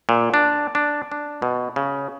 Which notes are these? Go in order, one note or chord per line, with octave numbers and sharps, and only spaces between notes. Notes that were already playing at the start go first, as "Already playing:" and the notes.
A#2
D4
D4
D4
B2
C#3